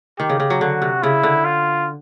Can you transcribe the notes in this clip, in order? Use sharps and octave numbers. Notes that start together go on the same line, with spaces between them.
D#3 G4
C#3
C#3
F#3
D3 F#4
C3
C#3 E4
D3
F4